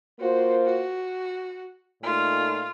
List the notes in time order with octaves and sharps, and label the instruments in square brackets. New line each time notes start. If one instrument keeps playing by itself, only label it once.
[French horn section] A#3 F4 C5 [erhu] F#4
[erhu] F#4
[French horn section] A#2 A3 D#4 [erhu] F4